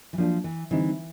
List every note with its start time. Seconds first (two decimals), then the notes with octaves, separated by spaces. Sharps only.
0.13 E3
0.18 F3 F#3 A#3 D4
0.44 E3
0.71 D3 E3 G3 C4 D#4